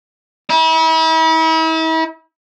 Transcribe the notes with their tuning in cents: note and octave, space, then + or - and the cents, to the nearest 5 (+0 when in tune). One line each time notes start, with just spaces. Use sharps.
E4 -40